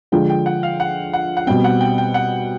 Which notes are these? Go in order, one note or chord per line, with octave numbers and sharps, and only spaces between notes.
D3 F3 G#3 G5
G5
F#5
F5
F#5
F#5
F#5
B2 G3 C4 G5
F#5
G5
G5
F#5